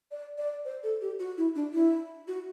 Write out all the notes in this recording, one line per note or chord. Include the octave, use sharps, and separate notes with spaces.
D5
D5
C5
A4
G4
F#4
E4
D4
E4
F#4